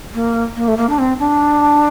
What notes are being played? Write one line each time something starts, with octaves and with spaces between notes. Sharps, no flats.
A#3
A#3
A3
A#3
D4
C4
D4